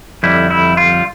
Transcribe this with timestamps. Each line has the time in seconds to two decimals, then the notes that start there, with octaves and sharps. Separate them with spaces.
0.23 F2 D3 G3 E4
0.50 E4
0.77 F4